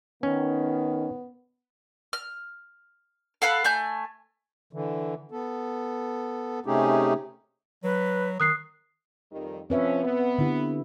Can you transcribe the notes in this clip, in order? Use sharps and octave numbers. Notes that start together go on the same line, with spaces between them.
D#3 B3 C#4
F6
A4 F5 F#5 B5
A3 G#5 G6
D3 E3
B3 A4
C3 A3 C#4 D#4 G4 G#4
F#3 B4
D#3 D#6 F#6 C7
F2 D#3 G3
F3 C4 C#4 B4 E5
B3
D3 E4 G4